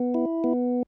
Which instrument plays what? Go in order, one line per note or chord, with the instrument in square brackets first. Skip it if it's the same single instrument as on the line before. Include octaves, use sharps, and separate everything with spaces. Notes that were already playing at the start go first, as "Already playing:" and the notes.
Already playing: [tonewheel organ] B3
E4
B3